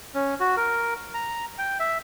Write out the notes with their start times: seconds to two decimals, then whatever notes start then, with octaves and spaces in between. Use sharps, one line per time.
0.15 C#4
0.40 F#4
0.57 A#4
1.14 A#5
1.58 G5
1.80 E5